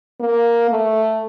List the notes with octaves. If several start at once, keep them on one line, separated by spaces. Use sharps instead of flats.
A#3
A3